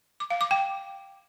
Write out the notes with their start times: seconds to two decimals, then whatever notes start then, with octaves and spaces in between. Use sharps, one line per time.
0.20 D6
0.30 F5
0.41 D6
0.51 G5